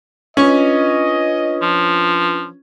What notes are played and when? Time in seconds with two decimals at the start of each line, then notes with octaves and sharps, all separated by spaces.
0.37 C#4 D4 F4 B4 D#5
1.62 F3